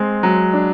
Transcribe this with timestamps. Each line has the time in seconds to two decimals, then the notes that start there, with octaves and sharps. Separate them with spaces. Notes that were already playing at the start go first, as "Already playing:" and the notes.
Already playing: G#3 C4
0.23 F#3
0.53 D4